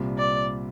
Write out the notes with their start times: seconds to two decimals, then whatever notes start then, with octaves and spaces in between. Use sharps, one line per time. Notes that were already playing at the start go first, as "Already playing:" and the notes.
Already playing: C2 A#2 G3 C4 F4
0.18 D5